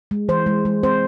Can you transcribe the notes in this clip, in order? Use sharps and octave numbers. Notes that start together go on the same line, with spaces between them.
G#3
E3 C5
G#3
G#3
C4 C5